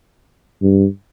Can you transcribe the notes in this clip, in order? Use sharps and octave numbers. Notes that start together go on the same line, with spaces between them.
G2